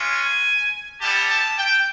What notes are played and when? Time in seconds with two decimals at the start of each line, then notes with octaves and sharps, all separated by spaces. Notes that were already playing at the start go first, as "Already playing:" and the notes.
Already playing: G#3 C#4 F4
0.14 G#5
1.00 G3 B3 E4 G4 A5
1.30 A5
1.58 G5